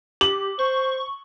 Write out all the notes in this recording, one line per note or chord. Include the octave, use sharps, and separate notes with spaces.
G4 F#7
C5 C#6